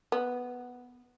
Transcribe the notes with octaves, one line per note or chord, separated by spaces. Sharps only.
B3